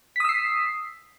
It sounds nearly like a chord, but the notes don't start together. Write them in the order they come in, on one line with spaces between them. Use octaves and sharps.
B6 D#6 E6 C7